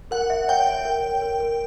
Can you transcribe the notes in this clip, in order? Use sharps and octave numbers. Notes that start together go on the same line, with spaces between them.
A#4 F#5
E5
C#5 G5
E5
A#4
C#5
A#4
A#4